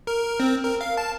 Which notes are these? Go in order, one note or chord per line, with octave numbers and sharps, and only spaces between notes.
A#4
C4
A#4
F5
A5